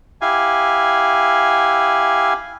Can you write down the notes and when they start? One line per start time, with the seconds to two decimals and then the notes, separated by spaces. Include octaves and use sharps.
0.21 E4 G4 F5 G#5